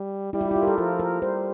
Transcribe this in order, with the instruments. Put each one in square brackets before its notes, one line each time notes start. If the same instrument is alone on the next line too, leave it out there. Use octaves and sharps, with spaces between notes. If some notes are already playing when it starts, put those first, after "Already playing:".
Already playing: [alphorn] G3
[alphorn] G3 [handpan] E4
[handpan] G4
F4
E4
F4
A#4
A4
[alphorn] F3 [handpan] A#4
[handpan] A#4
[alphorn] G3 [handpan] C5